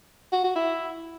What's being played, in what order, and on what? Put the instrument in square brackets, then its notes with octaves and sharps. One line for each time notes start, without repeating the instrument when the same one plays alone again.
[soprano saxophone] F#4
F#4
E4